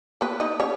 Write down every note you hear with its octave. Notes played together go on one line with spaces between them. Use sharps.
B3 B4
D#4 D#5
C#4 C#5